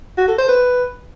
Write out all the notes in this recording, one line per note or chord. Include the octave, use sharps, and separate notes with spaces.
F#4
A4
C5
B4